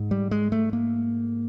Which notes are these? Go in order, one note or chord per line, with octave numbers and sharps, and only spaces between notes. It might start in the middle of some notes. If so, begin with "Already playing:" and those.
Already playing: G#2
G3
G#3
A3
A#3